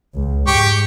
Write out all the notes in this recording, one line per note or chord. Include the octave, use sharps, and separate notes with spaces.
C#2
G#2 G4 G5 C#6